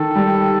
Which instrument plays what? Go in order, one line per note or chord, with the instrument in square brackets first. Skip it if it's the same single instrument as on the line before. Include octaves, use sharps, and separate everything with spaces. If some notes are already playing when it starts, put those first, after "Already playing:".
Already playing: [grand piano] D#3 [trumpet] A4
[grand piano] G3